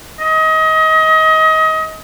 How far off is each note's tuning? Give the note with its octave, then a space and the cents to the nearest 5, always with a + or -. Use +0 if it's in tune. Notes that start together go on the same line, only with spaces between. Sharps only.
D#5 +30